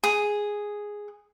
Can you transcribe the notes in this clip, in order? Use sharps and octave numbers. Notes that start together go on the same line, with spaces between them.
G#4